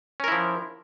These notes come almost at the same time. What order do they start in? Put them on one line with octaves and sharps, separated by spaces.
C#4 A#4 E4 F3